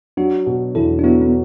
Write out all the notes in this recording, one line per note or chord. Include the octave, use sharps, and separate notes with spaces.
F#3 D4 F#4
B2
E2 E4 A4
D4
F#3 B3 E4
B3